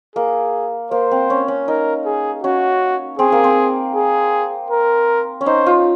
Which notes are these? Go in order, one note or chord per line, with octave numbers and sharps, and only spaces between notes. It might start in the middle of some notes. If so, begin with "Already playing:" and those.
A#3 G#4
A#3 C5
C4
C#4
C#4
D#4 A#4
G#4
C#4 F#4
C4 G#4
A#3
C4
G#4
A#4
C#4
D#4 C5
F4